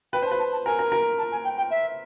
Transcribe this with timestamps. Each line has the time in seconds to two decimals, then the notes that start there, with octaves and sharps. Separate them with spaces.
0.13 B4 G5
0.23 C5 A5
0.31 B4
0.39 A5
0.52 A5
0.66 A#4 G#5
0.79 A#4
0.92 A#4
1.18 A5
1.32 G#5
1.44 G5
1.57 G5
1.71 E5